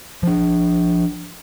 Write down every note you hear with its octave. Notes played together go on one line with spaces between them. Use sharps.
F3 D4